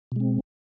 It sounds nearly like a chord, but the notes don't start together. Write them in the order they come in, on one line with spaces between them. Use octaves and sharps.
B2 G#3 C4